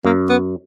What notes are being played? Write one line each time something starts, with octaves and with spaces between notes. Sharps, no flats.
F#2 A#3
B3